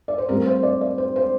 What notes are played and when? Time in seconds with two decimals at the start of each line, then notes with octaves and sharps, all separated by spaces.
0.08 D5
0.18 C5
0.28 A2 G3 C4 A#4
0.46 C5
0.63 D5
0.81 D5
0.98 C5
1.16 C5